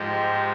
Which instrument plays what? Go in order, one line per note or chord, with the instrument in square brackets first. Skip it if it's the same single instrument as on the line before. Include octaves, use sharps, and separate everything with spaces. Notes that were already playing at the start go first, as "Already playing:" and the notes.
Already playing: [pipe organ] G#2 F3 G#3 G4